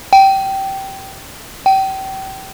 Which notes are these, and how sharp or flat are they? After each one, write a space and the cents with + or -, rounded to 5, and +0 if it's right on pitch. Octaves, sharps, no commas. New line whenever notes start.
G5 -15
G5 -30